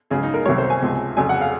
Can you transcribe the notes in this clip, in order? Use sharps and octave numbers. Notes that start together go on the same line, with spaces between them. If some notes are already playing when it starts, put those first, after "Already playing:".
C#2 C#3 F#3 G#4
D#4
A#4
C2 C3 D#3 F#3 C#5
C5
G#5
C#2 C3 F3
F2 C#3 F#3 G#5
F#5
F5